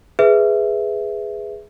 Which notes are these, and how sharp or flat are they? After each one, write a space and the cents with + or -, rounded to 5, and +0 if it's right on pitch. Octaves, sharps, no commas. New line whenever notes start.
G#4 +0 B4 +0 E5 +0